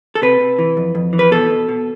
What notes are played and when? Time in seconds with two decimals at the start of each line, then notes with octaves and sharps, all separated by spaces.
0.15 A4
0.22 C3 B4
0.40 C3
0.59 E3
0.77 F2
0.95 F2
1.13 E3
1.19 B4
1.31 B2 A4
1.50 B2
1.69 B2